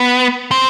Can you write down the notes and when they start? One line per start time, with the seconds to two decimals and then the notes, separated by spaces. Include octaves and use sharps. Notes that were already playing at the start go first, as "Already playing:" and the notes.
Already playing: B3
0.51 C4